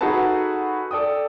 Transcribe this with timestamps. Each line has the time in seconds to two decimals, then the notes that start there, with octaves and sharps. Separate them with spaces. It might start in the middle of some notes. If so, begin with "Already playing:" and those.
0.01 D#4 F#4 G#4 A4 B4 A5
0.91 A4 D5 G5 D#6